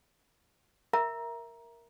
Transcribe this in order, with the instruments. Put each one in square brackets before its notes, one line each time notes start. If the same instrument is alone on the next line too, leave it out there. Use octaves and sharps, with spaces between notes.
[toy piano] A#4 E5 A#5